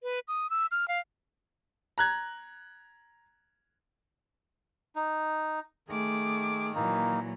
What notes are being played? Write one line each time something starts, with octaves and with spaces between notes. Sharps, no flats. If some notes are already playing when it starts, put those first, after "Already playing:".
B4
D#6
E6
F6
F5
A#5 F#6 G#6
D#4
D#3 A3 G#4 D6
A#2 E3 F#3 A#3 D#4